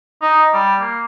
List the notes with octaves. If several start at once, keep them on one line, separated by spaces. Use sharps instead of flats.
D#4
G3
A#3